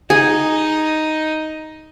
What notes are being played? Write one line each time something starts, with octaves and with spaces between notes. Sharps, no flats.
D#4 G#4